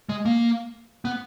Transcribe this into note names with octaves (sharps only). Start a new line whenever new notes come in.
G#3
A#3
B3